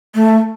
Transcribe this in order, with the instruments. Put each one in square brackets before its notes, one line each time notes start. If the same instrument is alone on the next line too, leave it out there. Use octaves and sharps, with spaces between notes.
[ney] A3